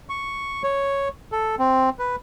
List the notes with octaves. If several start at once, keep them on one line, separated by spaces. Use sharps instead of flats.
C#6
C#5
A4
C4
B4